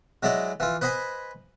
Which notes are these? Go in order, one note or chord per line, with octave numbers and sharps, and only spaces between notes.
F#3 G#3 E4 D5 D#5
E3 F4
B4 C5 D#5 G#5 B5